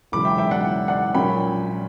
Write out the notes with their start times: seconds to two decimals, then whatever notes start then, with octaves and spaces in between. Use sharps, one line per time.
0.12 E1 E2 C#3 F#3 B5 D6
0.25 E5 G5
0.38 E5 G5
0.51 D5 F#5
0.88 D5 F#5
1.14 A#1 A#2 F#3 C#4 G5 B5